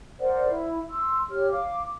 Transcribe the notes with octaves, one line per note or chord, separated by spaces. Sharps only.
A#4 C5 D5 F#5
E4
C6 E6
G4 C#5 F6
F5 D6